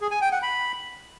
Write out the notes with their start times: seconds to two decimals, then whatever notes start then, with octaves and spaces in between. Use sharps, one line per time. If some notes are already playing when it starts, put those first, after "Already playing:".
0.01 G#4
0.11 G#5
0.22 G5
0.32 F#5
0.42 B5